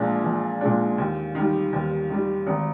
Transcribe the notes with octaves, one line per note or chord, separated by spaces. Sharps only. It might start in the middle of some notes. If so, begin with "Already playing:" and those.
Already playing: A#1 A#2 G#3 D4
A#1
A#2 G#3 D4
D#2
D#3 G3
D#2
D#3 G3
G#1